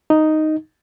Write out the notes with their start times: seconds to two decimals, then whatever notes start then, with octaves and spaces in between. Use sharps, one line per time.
0.10 D#4